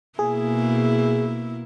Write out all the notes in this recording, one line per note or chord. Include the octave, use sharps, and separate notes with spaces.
B2 A#3 E4 G#4